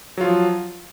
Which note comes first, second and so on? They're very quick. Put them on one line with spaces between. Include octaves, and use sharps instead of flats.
F#3 F4 F3